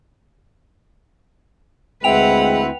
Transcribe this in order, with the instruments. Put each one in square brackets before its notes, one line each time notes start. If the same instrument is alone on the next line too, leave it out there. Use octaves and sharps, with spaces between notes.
[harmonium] D2 C4 E4 [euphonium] G#3 [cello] B4 F#5 [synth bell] G5 F7